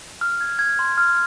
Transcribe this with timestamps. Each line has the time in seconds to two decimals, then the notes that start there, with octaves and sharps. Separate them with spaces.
0.21 F6
0.41 G#6
0.59 G#6
0.79 C6
0.98 F6